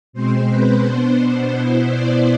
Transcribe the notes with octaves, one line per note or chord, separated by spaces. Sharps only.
B2 G#3 C4 C5
B4
B2 B3 D4 C5
C5
B2 B3 E4 C5
D5